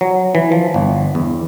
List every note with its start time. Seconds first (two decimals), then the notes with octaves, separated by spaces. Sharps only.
0.01 F#3
0.35 E3
0.52 F3
0.74 G1
1.15 E2